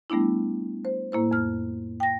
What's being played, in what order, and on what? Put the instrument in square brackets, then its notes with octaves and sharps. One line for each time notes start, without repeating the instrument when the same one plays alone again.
[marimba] G3 A3 B3 D4 E4
C5
A2 A#3 E4 C5
F2 F6
G5 A#6